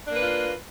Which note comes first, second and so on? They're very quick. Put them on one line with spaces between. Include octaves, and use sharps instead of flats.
D4 A#3 B4 F4